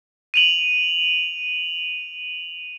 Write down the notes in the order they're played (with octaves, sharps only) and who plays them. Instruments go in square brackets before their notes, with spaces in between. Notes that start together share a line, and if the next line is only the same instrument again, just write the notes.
[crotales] D#7 F7 F#7